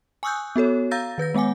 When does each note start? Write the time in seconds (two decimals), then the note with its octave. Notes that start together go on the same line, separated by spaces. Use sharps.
0.23 G#5 C#6 D#6 E6 F#6 G6
0.56 B3 F#4 A4 C#5
0.91 F5 A#5 E6 G6 A6 A#6
1.18 D#3 B4 G6 A#6
1.34 G#3 B3 F#5 G#5 D6